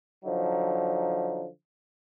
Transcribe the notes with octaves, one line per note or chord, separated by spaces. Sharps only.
D3 F3 F#3 D#4